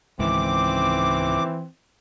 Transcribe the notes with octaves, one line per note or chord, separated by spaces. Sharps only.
C#2 G#2 D#3 E3 C4 D6